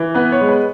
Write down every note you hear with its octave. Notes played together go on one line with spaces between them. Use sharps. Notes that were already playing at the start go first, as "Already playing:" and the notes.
Already playing: E3
B3 B4
C#5
G#3
B4